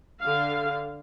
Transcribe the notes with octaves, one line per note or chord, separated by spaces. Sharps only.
D3 F5